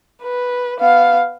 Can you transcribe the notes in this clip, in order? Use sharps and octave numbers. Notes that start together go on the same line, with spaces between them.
B4
B3 F5